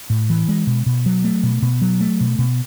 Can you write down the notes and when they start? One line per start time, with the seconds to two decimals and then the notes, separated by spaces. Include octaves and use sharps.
0.10 A2
0.30 E3
0.48 G#3
0.67 B2
0.86 B2
1.06 F#3
1.24 A3
1.43 B2
1.62 B2
1.82 F#3
2.00 A3
2.21 B2
2.39 B2